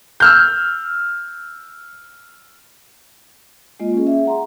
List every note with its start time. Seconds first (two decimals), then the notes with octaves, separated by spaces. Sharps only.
0.20 E6 F6 G6
3.80 G#3 A#3 F4 D#5
3.93 C#4 G#4
4.07 G#4 E5
4.25 F#5 A#5 C6